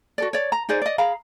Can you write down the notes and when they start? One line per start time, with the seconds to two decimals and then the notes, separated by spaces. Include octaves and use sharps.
0.18 F#4 A4 D5
0.33 C#5 D5
0.52 A#5
0.69 D#4 G#4 C5 D5
0.82 D5 D#5
0.98 G#4 F5 A#5 B5